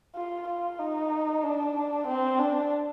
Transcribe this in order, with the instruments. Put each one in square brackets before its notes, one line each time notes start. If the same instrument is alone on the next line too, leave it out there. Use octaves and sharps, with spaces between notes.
[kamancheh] F4
F4
D#4
D4
C4
D4